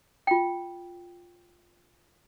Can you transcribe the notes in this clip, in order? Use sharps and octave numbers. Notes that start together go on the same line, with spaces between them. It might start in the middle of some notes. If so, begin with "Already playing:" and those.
F4 G5